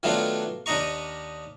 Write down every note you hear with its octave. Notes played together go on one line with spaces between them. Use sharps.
D#3 F#3 A3 B3 D4 F4
D#2 D4 D#4 D#5 A#5 C#6